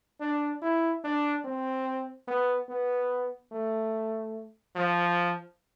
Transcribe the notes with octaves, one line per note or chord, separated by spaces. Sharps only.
D4
E4
D4
C4
B3
B3
A3
F3